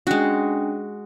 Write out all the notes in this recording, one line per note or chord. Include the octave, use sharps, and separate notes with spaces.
G#3 C#4 D4 F#4 G5